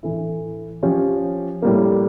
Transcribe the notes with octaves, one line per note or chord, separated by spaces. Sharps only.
A2 E3 A3 E4
F3 C#4 G4
A2 G3 A#3